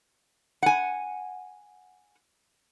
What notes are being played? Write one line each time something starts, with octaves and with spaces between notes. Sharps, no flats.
F#5 G#5